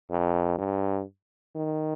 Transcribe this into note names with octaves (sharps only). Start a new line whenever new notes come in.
F2
G2
D#3